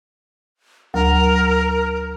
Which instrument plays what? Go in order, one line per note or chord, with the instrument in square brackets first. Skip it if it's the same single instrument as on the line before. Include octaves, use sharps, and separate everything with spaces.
[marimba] D2 F#3 [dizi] A#4